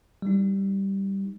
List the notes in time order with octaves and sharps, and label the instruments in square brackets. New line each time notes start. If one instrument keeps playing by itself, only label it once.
[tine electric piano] G3 D#4